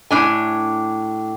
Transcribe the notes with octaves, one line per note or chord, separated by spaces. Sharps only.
A2 D4 G#5